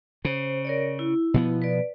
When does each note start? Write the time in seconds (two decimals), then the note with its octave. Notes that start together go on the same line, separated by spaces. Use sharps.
0.25 C#3 C5
0.65 A#4 C#5 D5
0.99 E4
1.34 B2 F3 B3
1.62 B4 D5